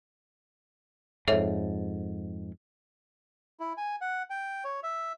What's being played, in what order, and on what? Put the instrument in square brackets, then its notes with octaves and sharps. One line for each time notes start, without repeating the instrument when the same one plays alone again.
[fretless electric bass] F2 G#2 [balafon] A4 C#5 E5
[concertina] E4
G#5
F#5
G5
C#5
E5